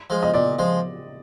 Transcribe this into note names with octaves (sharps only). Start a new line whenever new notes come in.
F3 G#3
D#5
A#2 D5
F3 G#3